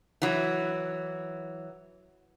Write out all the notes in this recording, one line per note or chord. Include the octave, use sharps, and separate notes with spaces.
E3 F#3